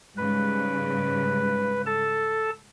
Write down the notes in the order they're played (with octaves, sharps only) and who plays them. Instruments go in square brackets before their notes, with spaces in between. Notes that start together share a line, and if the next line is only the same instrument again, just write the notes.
[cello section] G#2 C#3 G3 [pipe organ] B4
[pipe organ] A4 A5